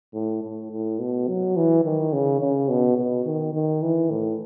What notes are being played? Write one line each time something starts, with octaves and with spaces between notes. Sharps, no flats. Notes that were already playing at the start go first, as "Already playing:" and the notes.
A2
A2
A2
B2
F#3
E3
D#3
C#3
C#3
B2
B2
D#3
D#3
E3
A2